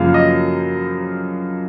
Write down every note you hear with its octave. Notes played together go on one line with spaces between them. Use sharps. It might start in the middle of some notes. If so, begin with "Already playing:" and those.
Already playing: F#2 C#3 F3 A#3 F5
D#5